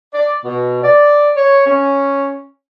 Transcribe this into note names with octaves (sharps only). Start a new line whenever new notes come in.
D5
B2
D5
C#5
C#4